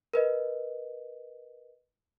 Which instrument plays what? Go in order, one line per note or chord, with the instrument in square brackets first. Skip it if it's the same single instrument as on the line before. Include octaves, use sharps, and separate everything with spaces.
[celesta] A#4 B4 D#5